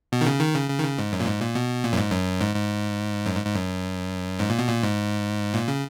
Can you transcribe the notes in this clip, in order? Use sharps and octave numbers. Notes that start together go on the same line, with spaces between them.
B2
D#3
C#3
D#3
C#3
C#3
D#3
C#3
G#2
F#2
A#2
G#2
A#2
B2
A#2
F#2
G#2
F#2
G#2
G#2
F#2
G#2
G#2
F#2
G#2
A#2
B2
A#2
G#2
A#2
C#3